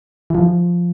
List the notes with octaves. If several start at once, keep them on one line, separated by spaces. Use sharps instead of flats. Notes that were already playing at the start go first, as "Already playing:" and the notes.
E3
F3